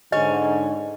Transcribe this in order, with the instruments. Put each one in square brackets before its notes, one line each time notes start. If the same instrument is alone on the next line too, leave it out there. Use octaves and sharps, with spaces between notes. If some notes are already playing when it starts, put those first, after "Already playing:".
[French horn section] G#2 D3 [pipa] C#4 [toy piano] D#5